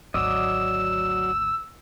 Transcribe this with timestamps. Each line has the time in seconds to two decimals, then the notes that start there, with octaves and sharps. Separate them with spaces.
0.14 G#1 D2 F#3 D5 D#5 E6